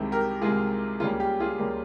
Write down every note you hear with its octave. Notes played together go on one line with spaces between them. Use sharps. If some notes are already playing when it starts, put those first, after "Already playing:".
Already playing: C2 C3 D#3 G#3
G4 A#4
C2 C3 D#3 G#3 F4 G#4
C#2 C#3 G3 A#3 F4 G#4
G4
F4 G#4
C#2 C#3 G3 A#3